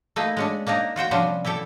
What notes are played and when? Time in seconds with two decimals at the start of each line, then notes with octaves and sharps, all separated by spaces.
0.16 A3 A#3 D#4 B4
0.37 G#3 C#4 D4
0.67 A#3 D4 D#4 A#4
0.96 F4 F#4 C5 G5
1.11 C3 F3 G3 C#4 D4 C5
1.45 E3 E4 G4 A4